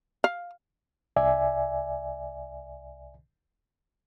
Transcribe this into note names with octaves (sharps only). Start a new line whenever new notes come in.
F5
C2 D5 E5 G#5